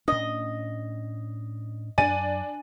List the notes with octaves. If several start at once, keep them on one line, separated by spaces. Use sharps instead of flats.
A2 C#4 D4 D#5
F#2 D4 G#5 A6 D#7